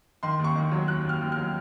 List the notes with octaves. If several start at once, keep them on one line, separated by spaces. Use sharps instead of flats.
D#3 C6
D#2
C#6
D#3
F#3
D#2 F#6
D#2 F6
D#2
F#3 F6